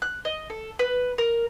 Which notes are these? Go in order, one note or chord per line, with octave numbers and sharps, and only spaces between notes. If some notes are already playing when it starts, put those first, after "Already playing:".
F#6
D#5
A4
B4
A#4